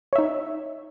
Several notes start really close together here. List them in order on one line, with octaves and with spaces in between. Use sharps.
C#5 E5 D#4